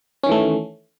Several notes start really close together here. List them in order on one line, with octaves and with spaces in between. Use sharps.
C#4 D#3 E3 A3